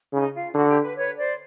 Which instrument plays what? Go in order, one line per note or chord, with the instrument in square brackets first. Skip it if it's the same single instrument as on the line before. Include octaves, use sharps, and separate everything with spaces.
[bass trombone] C#3 [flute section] D#4
[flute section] F4
[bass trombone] D3 [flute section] F#4
[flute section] G4
B4
B4 C#5
C5 D5